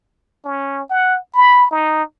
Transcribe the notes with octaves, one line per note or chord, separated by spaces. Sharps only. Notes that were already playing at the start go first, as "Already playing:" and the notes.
C#4
F#5
B5
D#4